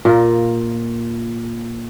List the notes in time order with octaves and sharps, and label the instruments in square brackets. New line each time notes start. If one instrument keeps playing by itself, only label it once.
[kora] A#2 F4 A#4